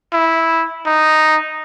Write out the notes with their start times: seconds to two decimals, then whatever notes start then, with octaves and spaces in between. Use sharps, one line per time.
0.13 E4
0.86 D#4